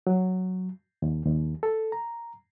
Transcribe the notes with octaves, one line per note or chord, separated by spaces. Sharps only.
F#3
D#2
D#2
A4
A#5